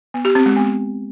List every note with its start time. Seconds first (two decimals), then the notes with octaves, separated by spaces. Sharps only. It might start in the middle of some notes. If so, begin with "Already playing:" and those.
0.14 B3
0.25 G4
0.35 C4
0.46 G#3
0.56 B3